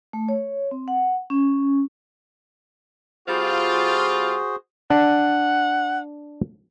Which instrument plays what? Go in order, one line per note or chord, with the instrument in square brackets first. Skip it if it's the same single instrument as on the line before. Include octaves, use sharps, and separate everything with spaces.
[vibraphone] A3
C#5
C4
F#5
C#4
[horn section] G3 C4 F4 [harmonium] F#4 G#4 C5
[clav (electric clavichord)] D4 [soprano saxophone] F#5